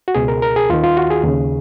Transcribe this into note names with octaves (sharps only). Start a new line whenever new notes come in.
F#4
C#2 B2 G#4
A#4
A#4
G#4
D#2 D#3 F4
F4
F#4
G#4
D#2 C#3